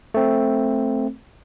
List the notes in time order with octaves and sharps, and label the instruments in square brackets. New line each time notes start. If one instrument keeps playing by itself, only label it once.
[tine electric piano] A3 C4